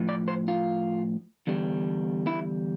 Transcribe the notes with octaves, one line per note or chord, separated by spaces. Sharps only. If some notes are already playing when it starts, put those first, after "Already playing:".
Already playing: A2 F3
D5
C5
F4
E2 D3 G3
E4